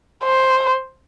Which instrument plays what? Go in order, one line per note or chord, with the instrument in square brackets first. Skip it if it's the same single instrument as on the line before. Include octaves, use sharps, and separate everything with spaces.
[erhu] C5